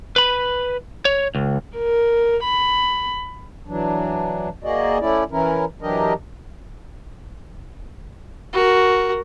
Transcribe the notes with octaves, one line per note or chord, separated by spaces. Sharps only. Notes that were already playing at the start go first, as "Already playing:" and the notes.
B4 B5
C#5
C#2
A#4
B5
E3 F#3 D4
A#3 F#4 G#4 D5 D#5
A3 C#4 E4 D5
E3 C#4 E4 A#4
E3 F#3 D4 G4 A#4 D#5
F#4 A#4